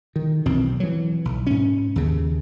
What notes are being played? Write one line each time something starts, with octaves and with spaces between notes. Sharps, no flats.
D#3
B1 E2 B2 C4
E3 F#3
B1
G#2 C#4
D#2 C#3